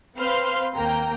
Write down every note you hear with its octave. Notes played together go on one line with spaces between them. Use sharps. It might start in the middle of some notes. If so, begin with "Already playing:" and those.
C4 B4 C5 F5 C6 F6
D#2 A#3 G5 A#5